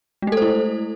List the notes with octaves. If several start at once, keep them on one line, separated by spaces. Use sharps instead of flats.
G#3 A3 E4 A4 C5